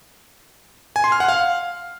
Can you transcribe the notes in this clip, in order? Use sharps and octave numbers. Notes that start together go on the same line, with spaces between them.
G#5
C6
F6
F#5
F5